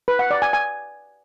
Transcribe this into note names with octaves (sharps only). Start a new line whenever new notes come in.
B4
F#5
D5
G#5
G#5